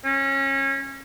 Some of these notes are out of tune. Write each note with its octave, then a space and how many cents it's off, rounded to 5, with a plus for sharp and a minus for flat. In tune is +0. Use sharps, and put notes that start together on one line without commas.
C#4 -25